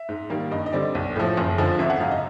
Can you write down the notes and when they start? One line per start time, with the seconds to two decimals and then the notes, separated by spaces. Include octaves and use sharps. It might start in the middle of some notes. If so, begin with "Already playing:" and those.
Already playing: E5
0.09 G#2
0.30 D#3 G3 A#3
0.51 G2 D#5
0.66 D#5
0.72 D3 G3 C4 D5
0.95 B1
1.16 A2 F3
1.37 F#1
1.58 F2 D3 F3 G#3
1.79 G#1 E5
1.90 F#5
2.00 F#2 C#3 F5
2.11 D#5